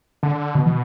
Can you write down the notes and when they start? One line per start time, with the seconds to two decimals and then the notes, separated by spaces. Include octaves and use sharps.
0.23 D3
0.55 B2 D3
0.66 E3